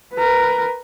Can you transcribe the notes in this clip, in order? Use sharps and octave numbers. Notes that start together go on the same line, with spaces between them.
A#4 B4